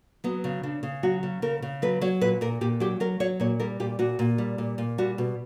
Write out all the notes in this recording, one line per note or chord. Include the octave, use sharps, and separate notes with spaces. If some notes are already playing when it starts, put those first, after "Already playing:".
F#3 B3
C#3
C#3 D4
C#3
F#3 F#4
C#3
C#3 A#4
C#3
F#3 B4
F#3 C#5
A#2 B4
A#2 A#4
A#2 G4
F#3 G4
F#3 A#4
F#3 C#5
A#2 C#5
G3 A#4
A#2 G4
A#2 F#4
A#2
G3
A#2
A#2
G3 F#4
B2